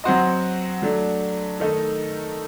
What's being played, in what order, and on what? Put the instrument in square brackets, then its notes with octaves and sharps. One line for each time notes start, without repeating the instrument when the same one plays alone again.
[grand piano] F#3 C4 F#4 C5 D#5
F#3 A3 D4
D#3 A3 D#4 A4 D#5